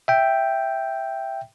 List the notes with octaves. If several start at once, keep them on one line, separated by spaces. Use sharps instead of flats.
E5 G5